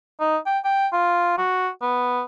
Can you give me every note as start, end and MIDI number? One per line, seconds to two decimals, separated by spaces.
0.20 0.37 63
0.46 0.59 79
0.64 0.87 79
0.93 1.35 65
1.38 1.69 66
1.82 2.22 59